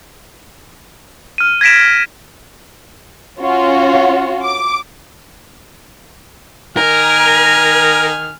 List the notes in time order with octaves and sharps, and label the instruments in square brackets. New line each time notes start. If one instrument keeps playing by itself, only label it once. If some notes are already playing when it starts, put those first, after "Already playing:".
[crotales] F6 D#7
G#6 A#6 B6 D7 E7
[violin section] C#4 F4 F#4
D6
[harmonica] D#3 G#5 F6 [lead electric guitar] A#4